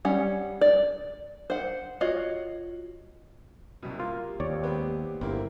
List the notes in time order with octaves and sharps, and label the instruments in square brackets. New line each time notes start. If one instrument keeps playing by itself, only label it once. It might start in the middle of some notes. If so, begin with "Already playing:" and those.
[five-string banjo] G3 C#4 F#5
D5
C5 F#5
F4 F#4 C#5 D#5
[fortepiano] C2 F#2 B2
[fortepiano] A#3 [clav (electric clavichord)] F4
[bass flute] G4
[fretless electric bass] D#2 [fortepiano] C4 [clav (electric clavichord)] C#5 D5
[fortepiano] G#3 B3 C4
[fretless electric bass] G1 [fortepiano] A#3 C4 E4